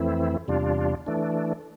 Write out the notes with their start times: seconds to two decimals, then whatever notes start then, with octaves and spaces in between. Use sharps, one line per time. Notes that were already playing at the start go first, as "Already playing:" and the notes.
Already playing: F2 E3 A3 C4 E4
0.48 E2 C3 G3 D4 F4
1.06 E3 A3 D4